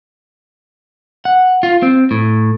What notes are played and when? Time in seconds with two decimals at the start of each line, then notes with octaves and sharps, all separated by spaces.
1.25 F#5
1.63 F4
1.83 C4
2.11 A2